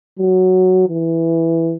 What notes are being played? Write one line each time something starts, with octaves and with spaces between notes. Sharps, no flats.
F#3
E3